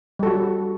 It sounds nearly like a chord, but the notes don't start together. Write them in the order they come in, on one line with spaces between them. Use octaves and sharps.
G3 A4 F#4